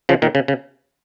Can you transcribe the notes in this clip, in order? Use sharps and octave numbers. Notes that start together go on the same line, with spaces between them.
C#3 F3
A#2 D#3
C#3
C#3